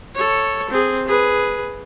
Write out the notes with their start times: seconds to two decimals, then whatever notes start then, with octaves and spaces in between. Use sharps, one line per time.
0.15 A4 C#5
0.71 C4 G#4
1.07 G#4 B4